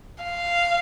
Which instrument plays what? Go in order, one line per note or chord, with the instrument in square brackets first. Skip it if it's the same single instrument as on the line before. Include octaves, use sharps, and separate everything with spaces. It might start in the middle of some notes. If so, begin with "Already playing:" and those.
[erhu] F5